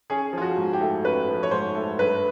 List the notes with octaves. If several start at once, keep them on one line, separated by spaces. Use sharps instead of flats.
C#4 G#4
F3 F4
F#4
G#2
G4
A3
C#4 B4
F3
C#5
G#2 C5
A3
G2 B4